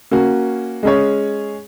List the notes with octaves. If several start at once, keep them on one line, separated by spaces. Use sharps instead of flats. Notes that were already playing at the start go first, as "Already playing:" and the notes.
A#3 C#4 F#4
G#3 C#4 G#4 C#5